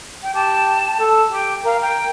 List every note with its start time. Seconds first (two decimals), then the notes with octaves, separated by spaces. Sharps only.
0.23 G5
0.35 G4 A5
1.00 A4
1.33 G4 G5
1.65 A#4 F5
1.82 G5